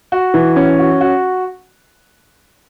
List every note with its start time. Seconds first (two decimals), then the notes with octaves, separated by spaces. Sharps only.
0.12 F#4
0.34 E3
0.56 C#4
0.79 F#4
1.01 F#4